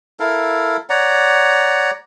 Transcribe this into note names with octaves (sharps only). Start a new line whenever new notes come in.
E4 A4 A#4 F5
C#5 D5 F#5 A#5